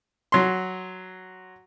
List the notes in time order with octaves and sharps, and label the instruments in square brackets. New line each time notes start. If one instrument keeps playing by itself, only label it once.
[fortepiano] F#3 C6